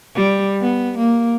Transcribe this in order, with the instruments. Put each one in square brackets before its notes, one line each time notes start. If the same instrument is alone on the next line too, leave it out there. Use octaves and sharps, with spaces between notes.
[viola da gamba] G3
B3
A#3